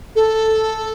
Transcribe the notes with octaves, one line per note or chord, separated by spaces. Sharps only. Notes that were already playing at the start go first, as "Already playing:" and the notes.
A4